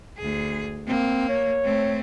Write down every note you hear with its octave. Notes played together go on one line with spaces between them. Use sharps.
D2 G#4
A#3 C4
C#5
A3 C4